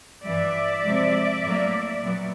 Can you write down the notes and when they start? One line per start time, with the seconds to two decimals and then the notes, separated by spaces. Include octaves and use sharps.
0.24 G2 E3 G3 D5 E5
0.84 C3 F3 G#3
1.43 A2 F#3 A#3
2.03 A#2 F#3 B3